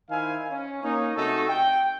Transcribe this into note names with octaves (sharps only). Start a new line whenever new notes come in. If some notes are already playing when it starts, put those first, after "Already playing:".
D#3 E4 C5 F5 G#5
C#4
A#3 C#4 D#4
C3 A3 D#4 F#4 A4
G5